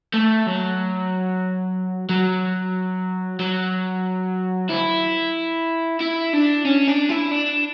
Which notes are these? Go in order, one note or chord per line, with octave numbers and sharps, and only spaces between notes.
A3
F#3
F#3
F#3
E4
E4
D4
C#4
D4
E4
D4